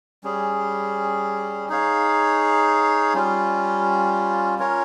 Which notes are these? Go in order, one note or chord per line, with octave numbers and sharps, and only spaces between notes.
G3 C#4 G#4
D#4 G#4 C#5 F5
G3 C#4 F4
C#4 F4 A#4 C#5